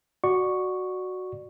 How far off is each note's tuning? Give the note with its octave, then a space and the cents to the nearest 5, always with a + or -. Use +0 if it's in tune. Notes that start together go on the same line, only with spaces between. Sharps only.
F#4 +0 D5 +20 C#6 +0